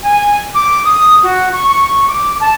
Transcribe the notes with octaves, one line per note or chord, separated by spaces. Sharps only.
G#5
D6
D#6
F#4
C#6
C#6
D6
A5